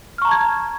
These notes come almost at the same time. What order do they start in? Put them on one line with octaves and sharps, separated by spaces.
F6 C#6 A#5 A5 G#6